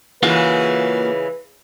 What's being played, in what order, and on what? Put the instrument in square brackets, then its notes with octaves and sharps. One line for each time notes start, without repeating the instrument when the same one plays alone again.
[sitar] C#3 E3 G#3 [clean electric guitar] A#3 F4 F#4 [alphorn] B4